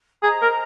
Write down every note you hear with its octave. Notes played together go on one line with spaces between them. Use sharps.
G#4 C5 D#5 A#5
A#4